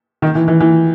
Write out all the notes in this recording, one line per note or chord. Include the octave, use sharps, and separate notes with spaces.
D#3
E3
E3
E3